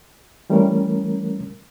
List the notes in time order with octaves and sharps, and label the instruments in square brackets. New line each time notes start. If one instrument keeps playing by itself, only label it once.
[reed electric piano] E3 G3 A3 C#4 A#4